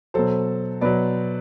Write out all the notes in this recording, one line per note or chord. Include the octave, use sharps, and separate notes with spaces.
B2 F#3 A4 C5
B2 F#3 B4 D5